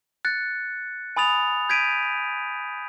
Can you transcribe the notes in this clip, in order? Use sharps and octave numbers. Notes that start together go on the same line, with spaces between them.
F#6 A6 C#7
G#5 B5 D#6 A6 F7
G6 G#6 B6 D7 D#7